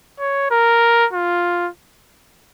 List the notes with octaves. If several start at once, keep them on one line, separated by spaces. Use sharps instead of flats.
C#5
A#4
F4